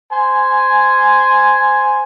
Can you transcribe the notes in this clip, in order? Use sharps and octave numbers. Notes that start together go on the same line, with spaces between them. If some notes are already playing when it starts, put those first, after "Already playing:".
C5 G#5